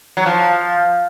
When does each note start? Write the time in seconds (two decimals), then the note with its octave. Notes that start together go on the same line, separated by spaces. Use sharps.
0.17 F#3
0.26 F3